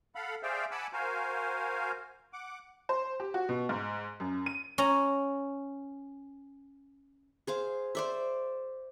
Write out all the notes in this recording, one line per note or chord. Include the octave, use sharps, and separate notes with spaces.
A4 F5 F#5 B5
G#4 C5 D5 E5 F5 G5
F#5 G#5 A5 B5 D6 E6
F#4 A#4 C5 F5 G#5
F#5 D6
C5
G4
F#4
B2
G#2
F#2
D#7
C#4 A#5
G#4 C5 F5
C5 D5 E5